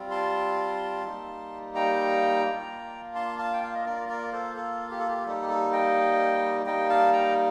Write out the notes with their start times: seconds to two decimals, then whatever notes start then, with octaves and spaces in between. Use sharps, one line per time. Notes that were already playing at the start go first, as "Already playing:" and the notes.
Already playing: G3 C4 F4
0.11 A5 C6
1.05 G3 A#3 D#4
1.75 G5 A#5
2.45 A#3 D4 F4
3.15 A5 C6
3.39 F5 A5
3.53 G5
3.64 F5
3.75 D#5
3.86 A#3 F4 A#4 D5
4.09 A#4 D5
4.27 D5
4.33 A4 C5
4.56 A4
4.91 G4
4.99 A4
5.08 G4
5.26 G3 A#3 D#4 A4
5.42 G4
5.49 A4
5.73 D#5 G5
6.66 G3 A#3 D#4 D#5 G5
6.89 F5 A5
7.13 G5 A#5